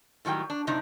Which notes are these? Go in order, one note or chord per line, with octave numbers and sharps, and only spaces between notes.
A2 D#3 F#3 G3 G5
D4
F#2 A2 C3 D4 D#4